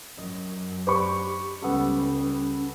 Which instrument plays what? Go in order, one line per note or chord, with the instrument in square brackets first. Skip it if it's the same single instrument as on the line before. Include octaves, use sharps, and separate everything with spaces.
[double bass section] F#2 [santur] D#5
[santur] D4 D5 B5 [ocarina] G4 [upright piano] C5 C#6
[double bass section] C#2 G3 [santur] B3 A4 [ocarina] C#4